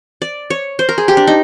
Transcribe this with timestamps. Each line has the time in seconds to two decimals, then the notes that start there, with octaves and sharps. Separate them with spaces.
0.22 D5
0.50 C#5
0.79 C5
0.89 A#4
0.98 G#4
1.08 G4
1.17 D4
1.27 D#4